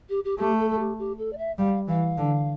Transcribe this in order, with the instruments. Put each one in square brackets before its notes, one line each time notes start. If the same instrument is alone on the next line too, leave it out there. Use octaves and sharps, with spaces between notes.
[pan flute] G4
G4
[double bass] A3 [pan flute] G4
[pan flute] A4
A4
G4
G4
A4
D5
E5
[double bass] G3 [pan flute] F5
[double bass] E3 [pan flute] F5
[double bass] D3